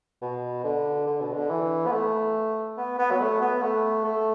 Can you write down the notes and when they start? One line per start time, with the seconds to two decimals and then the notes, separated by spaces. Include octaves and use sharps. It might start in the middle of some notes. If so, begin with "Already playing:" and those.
0.22 B2
0.64 D3
1.07 D3
1.21 B2
1.34 D3
1.50 E3
1.87 B3
1.92 A3
2.77 B3
2.99 B3
3.11 F#3
3.20 A3
3.42 B3
3.63 A3
4.05 A3